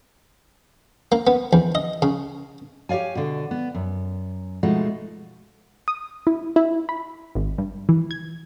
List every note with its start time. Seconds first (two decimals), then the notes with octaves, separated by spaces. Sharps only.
1.12 A#3
1.27 B3
1.53 E2
1.75 D#5
2.02 C#3
2.89 G4 C#5 D5 F5 G#5
3.15 B2 D3
3.51 B3
3.74 F#2
4.63 B2 F3 G#3 A3 D#4
5.88 D#6
6.27 E4
6.56 E4
6.89 B5
7.35 G#1
7.58 G2
7.89 E3
8.11 G#6